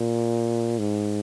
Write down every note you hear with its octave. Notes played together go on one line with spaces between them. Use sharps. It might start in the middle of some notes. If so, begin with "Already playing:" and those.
Already playing: A#2
G#2